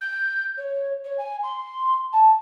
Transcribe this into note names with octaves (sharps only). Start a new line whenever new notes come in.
G6
C#5
C#5
G#5
C6
A5